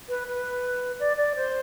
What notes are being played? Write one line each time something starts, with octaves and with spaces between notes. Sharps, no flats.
B4
B4
D5
D5
C5